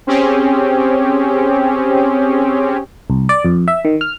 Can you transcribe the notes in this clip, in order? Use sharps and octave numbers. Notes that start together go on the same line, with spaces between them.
C4 C#4 G4 G#4
C2
D5
F2
E5
D#3
F6